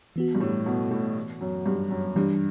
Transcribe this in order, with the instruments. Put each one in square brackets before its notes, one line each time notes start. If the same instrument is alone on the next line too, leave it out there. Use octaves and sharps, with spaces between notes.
[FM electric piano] E3 B3 F#4
[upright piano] G2
A2
B2
A2
F#2
G2
F#2
[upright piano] G2 [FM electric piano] E3 G3 D4